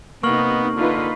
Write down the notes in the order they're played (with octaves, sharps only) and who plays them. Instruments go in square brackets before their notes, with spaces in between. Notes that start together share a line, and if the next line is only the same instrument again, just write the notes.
[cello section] C3 D#4 [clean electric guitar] A#3 [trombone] B3 [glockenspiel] C#6 F6 F#7
[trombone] D3 [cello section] D#4 F4 B4